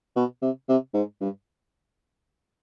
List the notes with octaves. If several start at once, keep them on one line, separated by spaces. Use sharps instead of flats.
B2
C3
C3
G#2
G2